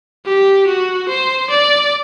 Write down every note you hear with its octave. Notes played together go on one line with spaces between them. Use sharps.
G4
F#4
C5
D5